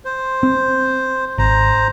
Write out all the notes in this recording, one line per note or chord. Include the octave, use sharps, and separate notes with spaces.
C5
C4
G#1 C5 A#5